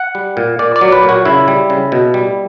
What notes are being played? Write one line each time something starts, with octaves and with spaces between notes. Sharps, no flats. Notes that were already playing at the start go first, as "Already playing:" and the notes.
Already playing: F#5
G3
A#2
A#2 D5
D5
F#3
B4
A#2
F#4
C#3 E4
G3
C#3
B2
G3